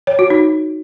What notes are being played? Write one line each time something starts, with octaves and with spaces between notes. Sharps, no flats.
C#5
F#4
D#4